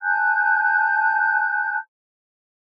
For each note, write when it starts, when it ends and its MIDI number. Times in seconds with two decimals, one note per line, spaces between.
0.01 1.78 80
0.01 1.78 81
0.01 1.78 90
0.01 1.78 91